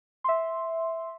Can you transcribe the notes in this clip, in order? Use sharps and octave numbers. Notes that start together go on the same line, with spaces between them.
E5 C6